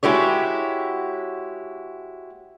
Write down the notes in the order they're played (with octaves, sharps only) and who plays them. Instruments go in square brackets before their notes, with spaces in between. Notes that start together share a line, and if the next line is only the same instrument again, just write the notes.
[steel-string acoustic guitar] G#3 E4 F#4 G4 C#5